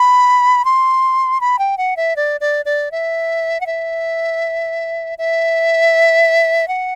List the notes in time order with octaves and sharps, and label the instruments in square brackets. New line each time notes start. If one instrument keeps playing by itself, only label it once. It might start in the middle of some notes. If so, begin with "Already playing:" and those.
Already playing: [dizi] B5
C6
B5
G5
F#5
E5
D5
D5
D5
E5
F#5
E5
E5
F#5